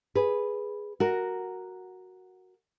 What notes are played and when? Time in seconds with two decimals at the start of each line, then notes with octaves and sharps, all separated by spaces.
0.15 G#4 B4
1.00 F#4 A#4